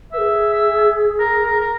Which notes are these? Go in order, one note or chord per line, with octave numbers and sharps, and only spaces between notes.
G#4 B4 E5
E5
A#4
A#4
A#4